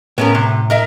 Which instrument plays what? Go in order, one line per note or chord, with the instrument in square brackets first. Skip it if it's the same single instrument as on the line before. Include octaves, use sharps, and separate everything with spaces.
[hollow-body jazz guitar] A2 [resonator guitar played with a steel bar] B3 C#4 A#4
[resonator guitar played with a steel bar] C3
A#4 D#5 E5